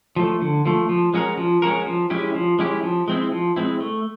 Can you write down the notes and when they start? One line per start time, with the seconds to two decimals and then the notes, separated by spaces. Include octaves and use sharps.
0.16 F3 A3
0.42 D3
0.65 F3 A3
0.89 F3
1.14 G#3 C#4 F#4 A#4
1.37 F3
1.62 G#3 C#4 F#4 A#4
1.86 F3
2.10 G#3 C#4 E4 G4
2.35 F3
2.59 G#3 C#4 E4 G4
2.83 F3
3.08 G#3 C4 E4
3.32 F3
3.56 G#3 C4 E4
3.80 A3